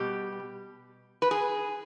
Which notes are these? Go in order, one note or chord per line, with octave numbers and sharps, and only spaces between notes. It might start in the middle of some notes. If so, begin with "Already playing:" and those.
Already playing: B2 G3 G4
B4
G#4